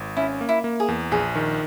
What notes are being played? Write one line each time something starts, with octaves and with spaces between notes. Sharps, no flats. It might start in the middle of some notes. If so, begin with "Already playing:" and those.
Already playing: G#1
C#4 E4
A#3
E4
A#3
G#4
E2
A#1 G#4
D#3